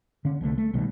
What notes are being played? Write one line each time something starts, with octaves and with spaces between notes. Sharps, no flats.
D3 C#4
C2 D3 G3 A3
A3
B1 B2 D#3 G3